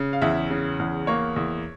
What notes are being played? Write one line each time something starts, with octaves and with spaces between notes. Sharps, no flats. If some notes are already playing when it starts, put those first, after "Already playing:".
Already playing: C#3
F5
E2 E5
C#3
E2
A#3 C#5
E2